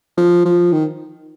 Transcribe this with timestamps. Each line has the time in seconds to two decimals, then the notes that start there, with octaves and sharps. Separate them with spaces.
0.17 F3
0.45 F3
0.72 D#3